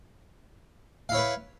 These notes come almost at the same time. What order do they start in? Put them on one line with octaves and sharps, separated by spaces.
F5 E4 C#5 B4